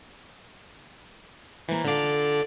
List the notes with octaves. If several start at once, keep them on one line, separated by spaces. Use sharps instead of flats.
E3 A#3 C5
D3 F4 A4 D5 F5